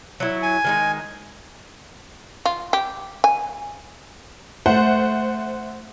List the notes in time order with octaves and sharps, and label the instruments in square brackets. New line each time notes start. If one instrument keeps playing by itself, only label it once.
[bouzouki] F#3 E4
[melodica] G#5
[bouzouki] D#3 G#3 D#4
[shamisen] F4
G4
G#5
[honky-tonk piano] A3 C5 F#5